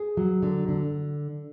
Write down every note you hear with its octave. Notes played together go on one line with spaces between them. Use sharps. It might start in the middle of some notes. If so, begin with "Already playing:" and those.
Already playing: G#4
F#3
D3
D3